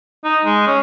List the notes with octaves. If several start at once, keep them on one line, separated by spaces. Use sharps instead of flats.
D#4
G#3
C#4